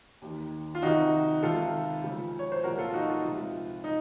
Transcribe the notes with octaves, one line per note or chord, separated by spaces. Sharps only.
D#2 D#3
F4
F2 C3 D#3 D#4 F#4
C#2 C3 D#3 F4 A4
C#2 C#3 F3
C#5
C5
C2 A#2 F3 F#4 A#4
F4 A4
D#4 F#4
F4
C#2 C3 F3
D#4